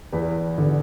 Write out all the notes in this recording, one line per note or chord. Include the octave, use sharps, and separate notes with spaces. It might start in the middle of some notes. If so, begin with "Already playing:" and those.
E2 B4
D3